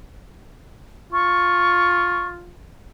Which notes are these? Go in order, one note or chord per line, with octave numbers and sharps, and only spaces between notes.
F4 C#6